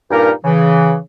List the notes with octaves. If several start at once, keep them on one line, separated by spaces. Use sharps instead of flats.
G2 A#2 D#4 G4 A#4
C#3 E3